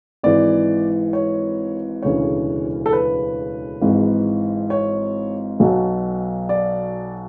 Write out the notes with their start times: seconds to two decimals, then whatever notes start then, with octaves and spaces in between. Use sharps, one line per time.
0.23 G#1 G#2 E3 D5
1.13 C#5
2.03 E1 D2 C#3 E3 C#5
2.86 A4
2.93 B4
3.81 G#1 G#2 E3
4.70 C#5
5.60 B1 B2 F#3
6.49 D5